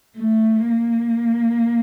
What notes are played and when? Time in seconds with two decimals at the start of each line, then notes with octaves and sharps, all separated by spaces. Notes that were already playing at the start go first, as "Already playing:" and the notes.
0.17 A3
0.68 A#3